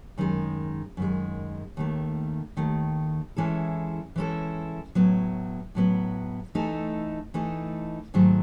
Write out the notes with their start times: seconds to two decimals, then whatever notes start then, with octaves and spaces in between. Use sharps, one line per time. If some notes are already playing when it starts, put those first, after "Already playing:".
0.18 F#2 D#3 G#3
0.97 F#2 D#3 G#3
1.77 D#2 D#3 A3
2.57 D#2 D#3 A3
3.36 E3 G#3 C#4 E4 A4
4.16 E3 G#3 C#4 E4 A4
4.95 A2 F#3 B3
5.75 A2 F#3 B3
6.55 E3 A3 D#4 A4
7.34 E3 A3 D#4 A4
8.14 G#2 D#3 F#3 A3